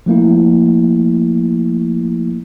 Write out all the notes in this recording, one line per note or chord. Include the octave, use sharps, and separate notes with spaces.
F3 A3 A#3 E4